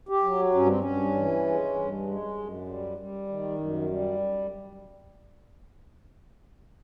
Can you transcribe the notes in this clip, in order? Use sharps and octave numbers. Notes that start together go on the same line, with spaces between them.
G4
F#3
G2 C#4
C4
C#4
G2
E3
G#3
G2
G#3
F#2
G3
G3
D#3
F#2
G3